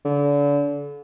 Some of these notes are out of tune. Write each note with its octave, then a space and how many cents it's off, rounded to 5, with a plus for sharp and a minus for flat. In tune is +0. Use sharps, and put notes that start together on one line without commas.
D3 -35